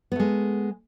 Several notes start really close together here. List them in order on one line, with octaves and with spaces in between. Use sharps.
B3 A3 G#3